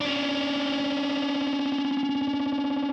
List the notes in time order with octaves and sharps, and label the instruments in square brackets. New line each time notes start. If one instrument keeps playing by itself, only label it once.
[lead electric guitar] C#4 D4